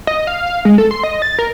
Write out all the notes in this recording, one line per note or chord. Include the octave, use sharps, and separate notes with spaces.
D#5
F5
F5
G#3
A4
C6
D#5
A6
A#4